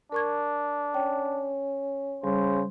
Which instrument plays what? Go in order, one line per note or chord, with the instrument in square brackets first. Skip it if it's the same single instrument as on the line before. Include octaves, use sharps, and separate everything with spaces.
[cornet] D4 [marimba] A#4 C#6 G#6
[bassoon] C#4 [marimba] G5
[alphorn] C#3 [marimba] G3 [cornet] C5